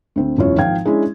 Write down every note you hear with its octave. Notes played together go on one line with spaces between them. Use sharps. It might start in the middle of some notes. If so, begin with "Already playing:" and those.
D2 C4
E1 F#2 E4 F4 C#5
G#1 F3 E4 F5 G5 G#6
G#3 C#4 D4 E4